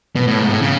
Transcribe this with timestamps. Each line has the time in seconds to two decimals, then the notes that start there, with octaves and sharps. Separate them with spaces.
0.16 B2
0.27 A2
0.39 G#2
0.50 A2
0.62 C#3